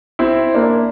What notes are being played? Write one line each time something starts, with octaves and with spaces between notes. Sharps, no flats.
C4 E4
A#3 D4